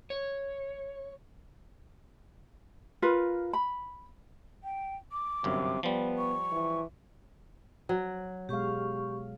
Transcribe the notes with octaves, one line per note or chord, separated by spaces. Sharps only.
C#5
F4 A#4 B4
B5
G5
D6
G1 F#2 C3
F3 G3 B3
C#6
E3
F#3
B2 G#3 G4 F5 C#6